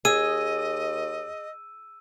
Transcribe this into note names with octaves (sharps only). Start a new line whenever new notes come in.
D#2 G#4 D#5 E6 D#7